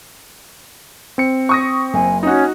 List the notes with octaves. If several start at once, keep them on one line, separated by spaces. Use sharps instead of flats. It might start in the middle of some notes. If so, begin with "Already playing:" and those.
C4 C#7
C#6 D#6 A#6
F#1 G#5
C#4 D#4 F#4